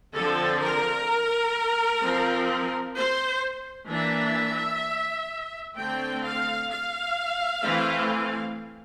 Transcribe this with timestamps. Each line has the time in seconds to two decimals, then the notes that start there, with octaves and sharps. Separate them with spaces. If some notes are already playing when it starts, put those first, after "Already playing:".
0.15 D3 F3 C4 A4
0.62 A#4
2.02 F3 C4
2.96 C5
3.90 E3 A#3 D4 E5
5.77 D3 A3 C4 G5
6.24 F5
6.71 F5
7.64 E3 A3 C4